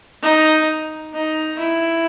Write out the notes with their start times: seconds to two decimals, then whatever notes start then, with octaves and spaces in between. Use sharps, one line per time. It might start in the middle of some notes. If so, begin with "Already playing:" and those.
0.23 D#4
1.14 D#4
1.59 E4